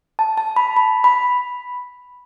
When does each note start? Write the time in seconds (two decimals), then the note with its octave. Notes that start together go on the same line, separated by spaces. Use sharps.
0.19 A5
0.37 A5
0.56 B5
0.77 B5
1.04 B5